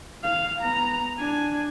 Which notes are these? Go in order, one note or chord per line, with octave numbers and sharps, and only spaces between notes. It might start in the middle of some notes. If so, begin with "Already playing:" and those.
F5
B3 A#5
D4 G#5